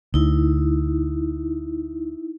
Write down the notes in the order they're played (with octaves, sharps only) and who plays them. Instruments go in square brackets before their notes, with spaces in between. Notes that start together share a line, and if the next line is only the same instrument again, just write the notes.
[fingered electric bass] D2 [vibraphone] D#4 E4